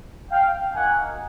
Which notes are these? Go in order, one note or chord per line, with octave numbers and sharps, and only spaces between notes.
F5 G5
A#3 D#4 F#4 F#5 G#5